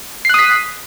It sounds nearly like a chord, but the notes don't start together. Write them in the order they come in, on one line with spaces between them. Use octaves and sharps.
C7 F#6 D#6 B6